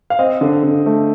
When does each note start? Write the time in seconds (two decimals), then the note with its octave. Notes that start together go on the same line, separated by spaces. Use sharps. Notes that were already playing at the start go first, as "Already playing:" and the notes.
0.10 F5
0.19 C4 D#5
0.41 D3
0.63 D3
0.86 A3